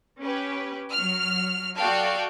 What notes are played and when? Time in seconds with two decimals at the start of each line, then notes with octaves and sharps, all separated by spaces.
0.21 C#4 G4 B4
0.92 F#3 F6
1.78 F#4 A4 D5 F5 G5 A5